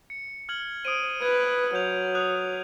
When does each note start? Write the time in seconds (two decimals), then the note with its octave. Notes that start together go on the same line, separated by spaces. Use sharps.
0.10 C#7
0.49 F6 G#6 F#7
0.85 C5 D#6 D7 D#7
1.22 B4 G#6
1.75 F#3 G6 F7
2.15 D#6 F#6 F7